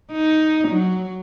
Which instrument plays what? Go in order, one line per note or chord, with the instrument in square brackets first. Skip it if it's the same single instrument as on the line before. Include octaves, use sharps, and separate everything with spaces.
[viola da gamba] D#4
F#3